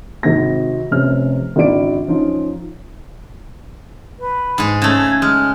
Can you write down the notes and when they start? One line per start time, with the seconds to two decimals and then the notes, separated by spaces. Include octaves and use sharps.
0.23 G#1 G#2 C3 A#6
0.91 F1 C3 C#4 F6
1.56 G#1 C#2 D3 E4 D5 D7
2.08 F3 C#4 D#4 F4
4.19 B4
4.58 G#2 G#4
4.82 C#3 A3 G#6
5.22 G#3 F6